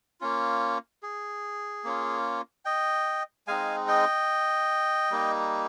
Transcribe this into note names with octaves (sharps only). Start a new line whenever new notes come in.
A#3 C#4 F4
G#4
A#3 C#4 F4
D#5 G5
G#3 C4 D#4 F5 G#5
D#5 G5
G3 A#3 D#4